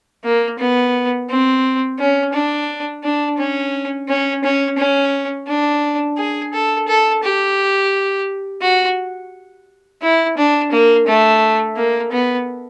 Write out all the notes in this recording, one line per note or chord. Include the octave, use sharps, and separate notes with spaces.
A#3
B3
C4
C#4
D4
D4
C#4
C#4
C#4
C#4
D4
G#4
A4
A4
G4
F#4
E4
D4
A#3
A3
A#3
B3